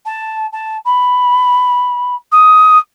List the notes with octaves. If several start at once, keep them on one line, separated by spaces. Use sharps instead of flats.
A5
A5
B5
D#6